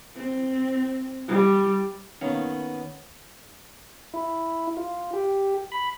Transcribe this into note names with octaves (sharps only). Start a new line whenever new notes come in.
C4
G3
D#3 A#3 B3 C#4
E4
F4
G4
B5